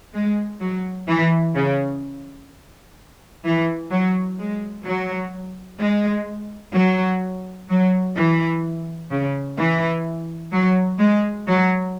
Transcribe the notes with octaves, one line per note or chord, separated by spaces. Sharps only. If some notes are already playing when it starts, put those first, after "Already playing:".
G#3
F#3
E3
C#3
E3
F#3
G#3
F#3
G#3
F#3
F#3
E3
C#3
E3
F#3
G#3
F#3